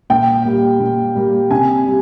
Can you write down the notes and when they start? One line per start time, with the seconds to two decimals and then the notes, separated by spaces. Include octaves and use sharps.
0.10 A#2 G5
0.45 G3 A#3
0.80 A#2
1.15 G3 A#3
1.50 C3 G#5
1.86 G3